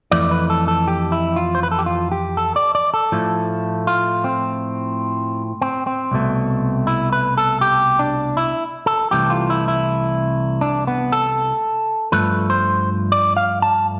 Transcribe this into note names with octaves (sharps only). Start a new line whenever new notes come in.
F2 E3 A3 D5
B4
A4
A4
G4
E4
F4
C5
B4
A4
G4
F4
G4
A4
D5
D5
A4
A2 F3 A3
F4
C4
C4
C4
C2 B2 A3
E4
B4
A4
G4
D4
E4
A4
C2 C3 E3 A3 G4
F4
E4
E4
D4
B3
A4
G2 F3 A3 B4
C5
D5
F5
A5